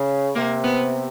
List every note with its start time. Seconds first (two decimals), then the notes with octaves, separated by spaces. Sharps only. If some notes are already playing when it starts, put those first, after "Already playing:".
Already playing: C#3
0.35 C3 A#3
0.64 B3